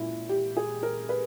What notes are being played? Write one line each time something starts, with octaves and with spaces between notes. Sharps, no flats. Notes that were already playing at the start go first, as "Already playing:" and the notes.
Already playing: A#2 G#3 C#4 E4
G4
G#4
A#4
B4